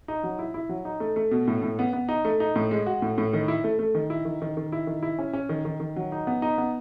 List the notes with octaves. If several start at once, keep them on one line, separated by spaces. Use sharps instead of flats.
D#4
F#3
E4
E4
F#3
D#4
A3
A3
B2
A2
A2
B3
B3
D#4
A3
D#4
A2
G#3
F#4
A2
A2
D#3
E4
A3
A3
D#3
E4
D#3
D#3
D#3
E4
D#3
E4
C#4
C#4
D#3
D#3
D#3
F#3
D#4
B3
D#4
B3